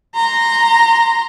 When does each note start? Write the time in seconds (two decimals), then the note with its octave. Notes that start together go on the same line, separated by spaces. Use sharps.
0.15 A#5 C6